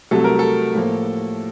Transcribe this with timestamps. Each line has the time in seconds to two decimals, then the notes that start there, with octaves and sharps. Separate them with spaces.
0.11 C2 C3 F#3 A3 A4
0.24 A#4
0.39 A4
0.75 A2 F3 A#3